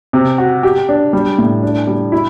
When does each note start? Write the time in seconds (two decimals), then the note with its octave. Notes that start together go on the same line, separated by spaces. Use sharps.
0.13 C3
0.38 F#4
0.63 G4
0.89 D4
1.13 G3
1.38 A2
1.63 D4
1.87 G3
2.12 E4